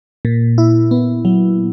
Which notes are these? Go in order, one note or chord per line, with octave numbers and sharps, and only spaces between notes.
A#2
E4
B3
F#3